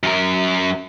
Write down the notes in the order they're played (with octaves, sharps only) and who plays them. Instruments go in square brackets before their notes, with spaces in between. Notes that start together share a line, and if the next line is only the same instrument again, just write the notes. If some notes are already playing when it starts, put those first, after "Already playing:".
[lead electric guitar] F#2 A#4